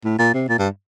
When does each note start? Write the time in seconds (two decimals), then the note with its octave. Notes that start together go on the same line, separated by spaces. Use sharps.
0.05 A2
0.19 A#2
0.34 C3
0.48 A#2
0.59 G2